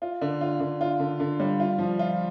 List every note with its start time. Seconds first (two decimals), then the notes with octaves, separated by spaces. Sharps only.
0.02 F4
0.21 D3
0.41 F4
0.60 D3
0.81 F4
1.00 D3
1.20 D3
1.40 G3
1.60 F4
1.78 F3
1.99 F4